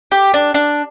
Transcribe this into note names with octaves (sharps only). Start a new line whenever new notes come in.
G4
D4
D4